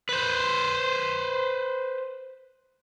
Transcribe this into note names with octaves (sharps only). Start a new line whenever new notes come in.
B4 C5